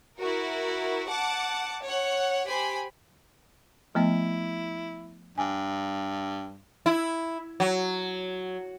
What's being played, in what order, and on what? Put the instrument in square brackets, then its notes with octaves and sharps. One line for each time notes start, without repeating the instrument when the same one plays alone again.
[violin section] E4 F#4 A#4
F#5 A5 D6
C#5 F#5
G4 C5 G#5 B5
[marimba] F3 A3 B3 [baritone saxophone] E4
[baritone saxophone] G2 [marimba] G#5
[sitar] E4
F#3